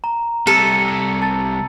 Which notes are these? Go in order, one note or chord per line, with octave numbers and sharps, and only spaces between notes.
A#5
C2 C3 A4 E6 C#7 D#7
A5 A6